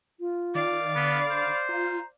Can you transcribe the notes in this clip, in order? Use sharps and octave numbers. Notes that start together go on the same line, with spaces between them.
F4
D#3 D5 F5
D3 B3 B5
C5
F4 A#5